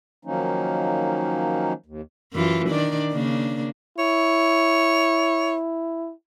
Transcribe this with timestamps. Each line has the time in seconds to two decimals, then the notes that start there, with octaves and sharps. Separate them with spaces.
0.25 D#3 F3 F#3 A#3 C#4 D#4
1.86 D#2
2.33 F#2 E3 F4
2.68 D#3 D4 D5
3.12 C#3 A#3 D4
3.99 E4 C#5